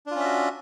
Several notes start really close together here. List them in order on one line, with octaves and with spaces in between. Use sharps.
D4 F4 C#4 E5 F#4